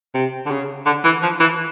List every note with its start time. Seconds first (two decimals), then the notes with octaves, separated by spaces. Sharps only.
0.14 C3
0.46 D3
0.50 C#3
0.86 D3
1.04 E3
1.22 F3
1.40 E3